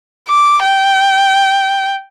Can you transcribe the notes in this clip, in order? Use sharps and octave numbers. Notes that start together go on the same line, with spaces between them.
D6
G5